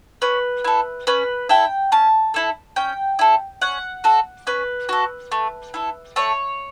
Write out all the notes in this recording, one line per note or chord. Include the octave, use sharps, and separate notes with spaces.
C#4 B4
E4 A4
C#4 B4
E4 A4 G5
C#4 A5
E4 A4
C#4 G5
E4 A4
C#4 F#5
F#4 A4
C#4 B4
F#4 A4
A3
E4 A4
A3 C#5